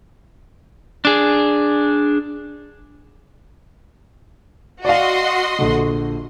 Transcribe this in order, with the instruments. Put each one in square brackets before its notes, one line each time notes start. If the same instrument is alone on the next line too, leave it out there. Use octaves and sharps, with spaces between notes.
[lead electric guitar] D4 G#4
[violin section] F#4 D#5 C6 [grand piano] D5 F5
[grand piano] A#1 D3